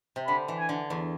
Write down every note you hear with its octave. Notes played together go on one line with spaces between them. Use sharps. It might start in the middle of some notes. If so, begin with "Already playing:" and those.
C3
D3 B5
E3
G#5
D3
E2